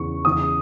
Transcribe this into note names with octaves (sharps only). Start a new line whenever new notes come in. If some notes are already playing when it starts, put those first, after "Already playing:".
Already playing: E2 C#3 E3 C#6
E2 C#3 E3 D#6